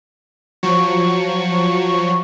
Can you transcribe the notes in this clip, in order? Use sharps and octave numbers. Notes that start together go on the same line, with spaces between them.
F3 F#3 C#6